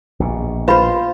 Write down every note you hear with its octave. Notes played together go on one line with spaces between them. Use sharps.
A#1 B2
F4 B4 C5 F5 B5